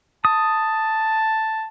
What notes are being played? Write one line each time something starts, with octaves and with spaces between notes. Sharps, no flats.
A5 D#6